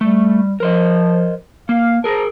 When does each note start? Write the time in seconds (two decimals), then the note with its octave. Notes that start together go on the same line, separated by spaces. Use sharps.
0.01 G3 A3
0.60 F3 A#4 C5 D#5
1.69 A#3 F5
2.04 G#4 A#4 C5 A5 A#5